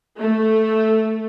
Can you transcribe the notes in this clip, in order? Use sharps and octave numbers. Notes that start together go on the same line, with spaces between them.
A3